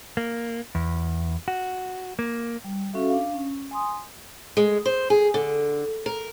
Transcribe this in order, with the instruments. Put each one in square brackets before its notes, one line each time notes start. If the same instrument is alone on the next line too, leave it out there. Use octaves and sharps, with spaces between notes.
[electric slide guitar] A#3
E2
F#4
A#3
[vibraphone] G3
C#4 F#4 A4 E5 F5
D4 F5
C#4
G#5 C6 D#6
[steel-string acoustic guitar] G#3
C5
G#4
D3
A#4